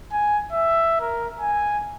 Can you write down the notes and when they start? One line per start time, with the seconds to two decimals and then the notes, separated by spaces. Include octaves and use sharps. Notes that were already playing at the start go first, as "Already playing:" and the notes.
0.12 G#5
0.52 E5
1.01 A#4
1.40 G#5